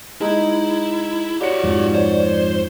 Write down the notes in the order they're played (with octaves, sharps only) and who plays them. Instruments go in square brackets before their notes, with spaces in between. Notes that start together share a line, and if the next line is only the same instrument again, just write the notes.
[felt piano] G#3 D#4 [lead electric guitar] E4
[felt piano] F#4 C#5 C#7 [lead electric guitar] G4 F#5 [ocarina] D5
[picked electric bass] F2 G#2 F3
[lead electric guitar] C5 [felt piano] C#5